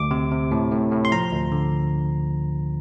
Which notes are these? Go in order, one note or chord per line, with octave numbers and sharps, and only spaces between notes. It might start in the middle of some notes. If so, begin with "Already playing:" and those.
Already playing: D2 D6
C3
C3
A2
A2
A2
C6
F3 A#5
D2
D3